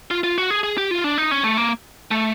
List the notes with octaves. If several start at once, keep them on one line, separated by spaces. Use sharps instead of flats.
F4
F4
F#4
G#4
G#4
G4
F4
D4
D#4
C#4
A3
A#3
A3